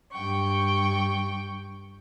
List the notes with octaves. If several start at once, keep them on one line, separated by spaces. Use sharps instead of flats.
G2 G5 C#6